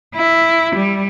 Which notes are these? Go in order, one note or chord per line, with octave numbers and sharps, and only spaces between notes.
E4
G3